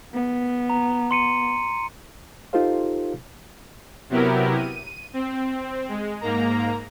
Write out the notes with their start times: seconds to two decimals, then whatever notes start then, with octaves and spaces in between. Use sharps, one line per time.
0.14 B3
0.70 A#5
1.11 C6 C#7 D#7
2.53 D#4 F4 G4 A4 C5 F5
4.10 C3 F#3 B3 E4 G4 A#4
4.57 D#7
5.13 C4
5.89 G#3
6.21 G#2 A#3 A#5